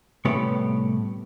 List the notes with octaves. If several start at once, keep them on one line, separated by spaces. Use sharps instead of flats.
C2 A2 B3 G4 C#5